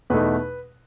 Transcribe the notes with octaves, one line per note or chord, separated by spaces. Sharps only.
E2 B2 A3 D#4 B4